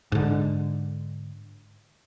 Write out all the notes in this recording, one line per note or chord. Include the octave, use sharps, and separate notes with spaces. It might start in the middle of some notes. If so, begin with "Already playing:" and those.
G#2 D3